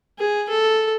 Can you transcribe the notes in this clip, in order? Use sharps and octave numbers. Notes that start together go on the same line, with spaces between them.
G#4
A4